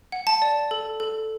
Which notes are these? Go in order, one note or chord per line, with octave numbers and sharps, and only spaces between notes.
F#5
A5
D5
A4
A4